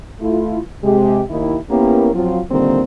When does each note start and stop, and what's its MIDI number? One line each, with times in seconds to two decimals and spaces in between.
0.20 0.59 57
0.20 0.59 64
0.20 0.59 65
0.83 1.21 48
0.83 1.21 56
0.83 1.21 67
1.29 1.57 39
1.29 1.57 64
1.70 2.10 58
1.70 2.10 59
1.70 2.10 61
1.70 2.10 64
1.70 2.10 67
1.70 2.10 70
2.14 2.40 53
2.14 2.40 54
2.14 2.40 60
2.14 2.40 65
2.50 2.81 46
2.50 2.81 50
2.50 2.81 51
2.50 2.81 55
2.50 2.81 58
2.50 2.81 60